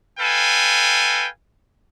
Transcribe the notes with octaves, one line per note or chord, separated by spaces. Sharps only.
A4 B4 F5 G5 G#5